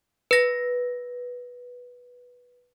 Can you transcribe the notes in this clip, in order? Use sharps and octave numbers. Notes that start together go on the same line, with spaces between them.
B4 A#6